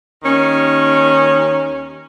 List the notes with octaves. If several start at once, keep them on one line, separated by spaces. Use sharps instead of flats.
D#2 D#3 C#4